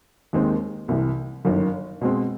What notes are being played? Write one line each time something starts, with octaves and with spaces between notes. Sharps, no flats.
D#2 D#3 G#3 C4
C2 C3 E3
G1 F#2 D#3
B2 G#3 C4